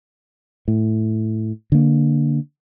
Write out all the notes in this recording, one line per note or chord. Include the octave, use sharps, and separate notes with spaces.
A2
D3 A#3